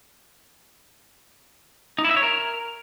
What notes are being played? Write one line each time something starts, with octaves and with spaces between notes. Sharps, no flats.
D#4
E4
E5
C#5
A#4